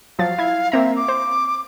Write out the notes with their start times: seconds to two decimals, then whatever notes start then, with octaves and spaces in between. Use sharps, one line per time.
0.19 F3 F#3 F5 A6
0.38 E4 G#6
0.72 A#3 C4 E5 A#5
0.96 D6
1.08 C5